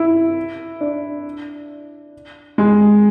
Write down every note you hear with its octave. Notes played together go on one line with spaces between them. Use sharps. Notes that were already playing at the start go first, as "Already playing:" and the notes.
Already playing: E4
D4
G#3